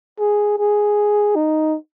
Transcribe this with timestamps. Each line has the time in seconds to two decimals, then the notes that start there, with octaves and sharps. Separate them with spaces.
0.19 G#4
0.59 G#4
1.36 D#4